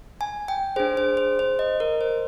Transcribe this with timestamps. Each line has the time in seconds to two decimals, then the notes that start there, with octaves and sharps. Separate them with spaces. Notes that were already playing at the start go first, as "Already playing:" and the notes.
0.21 G#5
0.48 G5
0.76 D4 G#4 C5
0.97 C5
1.17 C5
1.39 C5
1.59 D#5
1.80 A#4
2.01 C5